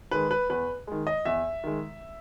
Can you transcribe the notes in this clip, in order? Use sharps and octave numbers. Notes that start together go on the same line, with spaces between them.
D#3 G#3 B4
B4
E2 B4
D#3 G#3
D#5
E2 E5
D#3 G#3